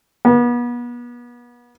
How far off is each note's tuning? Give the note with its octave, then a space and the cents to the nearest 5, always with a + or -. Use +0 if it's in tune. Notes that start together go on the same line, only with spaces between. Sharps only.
B3 -35